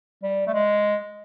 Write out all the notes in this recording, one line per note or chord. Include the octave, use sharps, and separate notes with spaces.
G3
A3
G#3